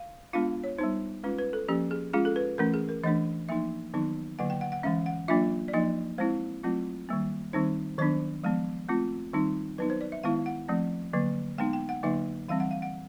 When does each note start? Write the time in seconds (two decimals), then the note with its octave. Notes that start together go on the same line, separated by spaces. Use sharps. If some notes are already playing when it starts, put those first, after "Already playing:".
Already playing: F5
0.33 G#3 B3 D4 F4 F5
0.64 C#5
0.79 G3 B3 D#4 C5
1.24 G#3 C#4 F4 B4
1.38 B4
1.53 A4
1.68 F3 A#3 C#4 G4
1.91 G#4
2.14 G#3 C#4 F4 G#4
2.25 A4
2.36 B4
2.58 E3 A3 C#4 A#4
2.74 G#4
2.89 A#4
3.04 E3 A3 D4 D#5
3.49 F3 A#3 D#4 E5
3.94 D#3 F#3 B3 D#4
4.39 D3 F#3 A#3 F#5
4.50 G5
4.61 F#5
4.72 F#5
4.83 E3 G#3 C#4 E5
5.06 F#5
5.28 F#3 A#3 D4 F4 E5
5.68 D5
5.74 F3 A#3 D#4 D#5
6.18 G#3 C4 E4 C5
6.63 F#3 A3 C4 F4
7.09 D#3 G3 A#3
7.53 D#3 G3 C4 D#4 C5
7.98 D#3 F#3 B3 D4 C5
8.44 F3 G#3 B3
8.89 A3 C4 F4
9.33 D#3 G3 C4 D#4
9.78 F#3 B3 D#4 B4
9.90 C5
10.01 D5
10.12 E5
10.23 D#3 G#3 B3 E4 F5
10.46 F#5
10.69 F3 A3 C4
11.13 D3 F#3 A#3
11.58 G#3 B3 D#4 G5
11.73 G5
11.89 F#5
12.03 D3 F#3 A#3 D#4 E5
12.48 E3 G3 C4 F5
12.60 F#5
12.71 F5
12.82 F#5